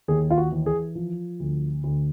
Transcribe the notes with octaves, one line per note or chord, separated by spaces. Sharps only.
D#2 G#4
F4
F#4
E3
G#4
F3
D2
D2